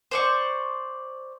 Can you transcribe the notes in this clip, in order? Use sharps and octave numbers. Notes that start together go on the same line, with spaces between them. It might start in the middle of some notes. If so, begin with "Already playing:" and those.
C5 D5 C#6